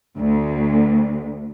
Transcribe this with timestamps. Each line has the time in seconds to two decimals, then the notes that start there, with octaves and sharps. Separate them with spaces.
0.18 D2